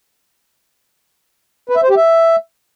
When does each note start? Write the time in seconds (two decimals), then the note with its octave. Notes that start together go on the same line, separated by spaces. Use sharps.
1.69 B4
1.76 E5
1.83 C5
1.90 G4
1.97 E5